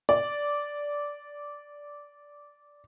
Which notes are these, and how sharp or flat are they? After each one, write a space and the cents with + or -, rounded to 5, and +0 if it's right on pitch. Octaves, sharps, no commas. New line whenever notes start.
D5 -10